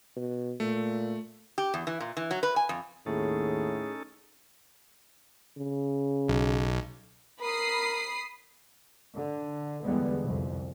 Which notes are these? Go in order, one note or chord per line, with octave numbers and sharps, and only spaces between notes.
B2
A#2 A3
G4
E2
E3
A#2
E3
F#3
B4
G#5
F2
D#2 A2 C#4 D#4 G#4 A4
C#3
B1
A#4 B5 D#6 C7
D3
E2 D3 G3 G#3 B3
C2 F2